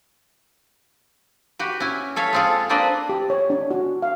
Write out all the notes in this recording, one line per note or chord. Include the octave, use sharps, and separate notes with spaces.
F#4 G4 B4
C#4 E4 G#5
A4 C#5 E5 F5
G#3 C4 F4 G#4 A4
A#3 C4 D4 B4 D5 D#5
G4
C#5
D4
F#4
F5